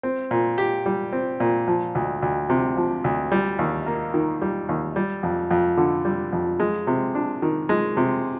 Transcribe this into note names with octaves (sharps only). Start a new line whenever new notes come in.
C4
A#2
G4
G3
C4
A#2
F3
D2
D2
C3
F3
D2
G3
D#2
A#3
D#3
G3
D#2
G3
F2
F2
D3
G3
F2
G#3
C3
D4
D#3
G#3
C3